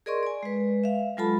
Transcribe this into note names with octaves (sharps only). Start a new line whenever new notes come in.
G#4 A#4 D5 D#5 C6 C#6
D5 G#5
G#3 B4
E5 F5
F#3 G#3 F4 A4 A5 B5